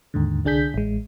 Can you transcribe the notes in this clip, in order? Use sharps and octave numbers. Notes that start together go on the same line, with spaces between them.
D#2 G#2 D3
C2 D3 D4 G#4 G6 B6
A1 G#3